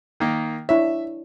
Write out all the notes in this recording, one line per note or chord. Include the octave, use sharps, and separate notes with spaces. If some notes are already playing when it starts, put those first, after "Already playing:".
D#3 A#3
D4 E4 C#5 E5